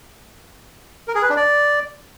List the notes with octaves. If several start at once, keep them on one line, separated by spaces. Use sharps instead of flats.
A#4
G#4
B4
D4
D5